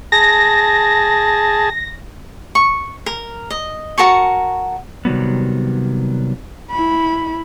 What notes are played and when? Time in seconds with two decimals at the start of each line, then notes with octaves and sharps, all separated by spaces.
0.12 G#4 A5 A#6
2.55 C#6
3.06 A#4
3.50 D#5
3.98 F#4 A#4 A5 C#6
5.05 C3 D#3 F#3 G3 B3
6.71 E4 B5